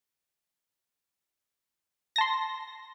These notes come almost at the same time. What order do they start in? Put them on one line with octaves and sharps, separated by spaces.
A#6 A5 C6